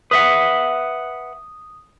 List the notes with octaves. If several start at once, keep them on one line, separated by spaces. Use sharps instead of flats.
B4 E5 F#5 D#6